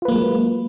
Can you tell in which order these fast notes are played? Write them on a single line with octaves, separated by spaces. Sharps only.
F4 B4 A#3 F#3 G#3